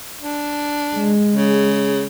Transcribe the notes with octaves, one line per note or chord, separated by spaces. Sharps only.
D4
G#3
C#3